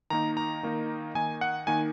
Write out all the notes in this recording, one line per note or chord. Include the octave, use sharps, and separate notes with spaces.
D#3 A#3 D#4 A#5
A#5
D#3 A#3 D#4
D#3 A#3 D#4 G#5
F#5
D#3 A#3 D#4 G#5